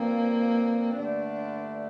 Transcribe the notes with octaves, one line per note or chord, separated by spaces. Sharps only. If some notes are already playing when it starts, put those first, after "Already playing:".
Already playing: G2 F3 A#3 C4
G2 D3 A3 D4